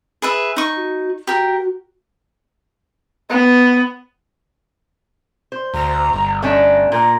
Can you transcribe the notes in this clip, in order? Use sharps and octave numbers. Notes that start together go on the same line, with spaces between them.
G#4 B4 E5
D#4 C#6
F#4
F#4 G4 A#4
B3
C5
D2 A#5
G1
A3 C#4 D4 D#5
A#2 A#4